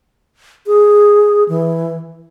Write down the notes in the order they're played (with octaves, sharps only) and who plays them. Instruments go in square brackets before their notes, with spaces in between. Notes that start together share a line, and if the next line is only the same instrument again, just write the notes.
[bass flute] G#4
E3